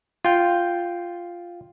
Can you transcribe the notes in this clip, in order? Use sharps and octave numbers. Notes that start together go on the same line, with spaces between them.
F4 G5